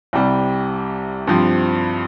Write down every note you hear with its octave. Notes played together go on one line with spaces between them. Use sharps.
C2 C3 G3
G2 F3 C4